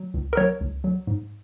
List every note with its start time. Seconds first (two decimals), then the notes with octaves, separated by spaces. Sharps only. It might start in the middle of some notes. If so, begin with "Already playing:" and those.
Already playing: F#3
0.14 C#2
0.33 A#4
0.37 F#3 C#5
0.61 C#2
0.84 F#3
1.07 G#2